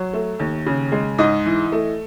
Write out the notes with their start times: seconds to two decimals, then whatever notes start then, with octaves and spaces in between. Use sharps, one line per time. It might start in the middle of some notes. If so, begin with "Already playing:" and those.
Already playing: F#3 C#5
0.13 A3
0.39 D#2
0.66 C#3
0.92 G#3
1.18 G#2 D#5
1.46 E3
1.72 A3